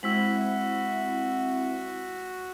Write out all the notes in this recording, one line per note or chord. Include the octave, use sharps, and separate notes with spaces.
G#3 C4 E4 F#4 E6 B6 F#7